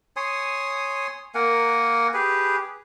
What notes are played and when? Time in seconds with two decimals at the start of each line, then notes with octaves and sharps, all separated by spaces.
0.16 C#5 G#5 C6 D#6
1.35 A#3 A#4 F#5 G#5
2.14 G4 G#4 B4